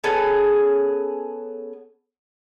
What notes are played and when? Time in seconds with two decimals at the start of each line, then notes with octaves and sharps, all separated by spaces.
0.04 B3 C#4 G#4 A4